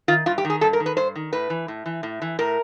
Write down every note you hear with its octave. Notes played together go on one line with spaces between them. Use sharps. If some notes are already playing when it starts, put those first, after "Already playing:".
D#3 F4
G2 F4
G4
D#3
G#4
G2 A4
A#4
D#3
B4
G2 C5
D#3
A2 B4
E3
A2
E3
A2
E3
A2 A#4